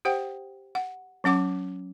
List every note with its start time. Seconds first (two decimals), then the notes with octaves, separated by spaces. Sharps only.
0.05 G4 C5 F#5 G5
0.75 F#5
1.24 F#3 C#4 F#5 D6